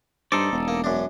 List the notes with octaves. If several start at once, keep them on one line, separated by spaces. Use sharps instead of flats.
G2 D#4 A4 C5 D5
E1
A#3
F#2 D4